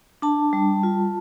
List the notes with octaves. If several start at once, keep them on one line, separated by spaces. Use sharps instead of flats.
D4 A5
G3
F4